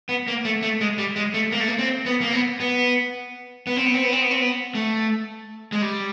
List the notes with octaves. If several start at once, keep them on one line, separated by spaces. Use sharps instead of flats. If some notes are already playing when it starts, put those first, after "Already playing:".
B3
A#3
A3
A3
G#3
G3
G#3
A3
A#3
A3
A#3
C4
B3
A#3
B3
B3
B3
C4
B3
C4
B3
C4
B3
C4
B3
A3
G#3
G3